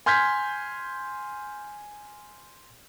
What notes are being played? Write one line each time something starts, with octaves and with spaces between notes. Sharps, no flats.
G#5 C6 F6 G6 G#6 B6